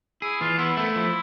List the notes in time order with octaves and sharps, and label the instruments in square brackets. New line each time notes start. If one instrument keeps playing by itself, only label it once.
[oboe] E4 [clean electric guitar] G#4
[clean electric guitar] E3 [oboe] F4
[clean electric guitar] B3 [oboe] E4
[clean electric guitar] A3 [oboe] E4
[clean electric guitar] F3